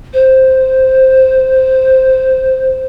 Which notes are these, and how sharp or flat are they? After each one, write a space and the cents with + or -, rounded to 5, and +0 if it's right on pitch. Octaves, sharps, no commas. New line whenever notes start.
C5 +0